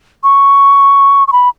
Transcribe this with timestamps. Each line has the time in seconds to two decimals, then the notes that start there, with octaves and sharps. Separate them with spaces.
0.23 C#6
1.28 C#6
1.32 B5